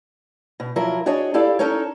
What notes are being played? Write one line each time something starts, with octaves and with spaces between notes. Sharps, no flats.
B2
F3 F#3 E4 A#4
D4 F#4 G#4 C#5 D#5
E4 G4 A4 D5 F5
C#4 D#4 A4 A#4 C#5